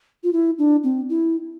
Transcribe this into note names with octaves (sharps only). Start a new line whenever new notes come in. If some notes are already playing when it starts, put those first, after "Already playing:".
F4
E4
D4
C4
E4